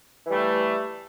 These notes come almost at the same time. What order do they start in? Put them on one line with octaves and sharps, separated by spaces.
E3 G3 A3